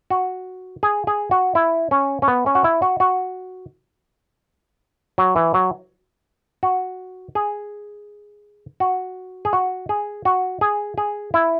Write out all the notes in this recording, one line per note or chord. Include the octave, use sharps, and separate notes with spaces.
F#4
G#4
G#4
F#4
E4
C#4
C#4
B3
C#4
F#4
E4
F#4
F#4
F#3
E3
F#3
F#4
G#4
F#4
G#4
F#4
G#4
F#4
G#4
G#4
E4